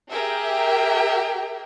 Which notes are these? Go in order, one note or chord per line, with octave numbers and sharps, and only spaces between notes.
G4 G#4 A#4 E5 G5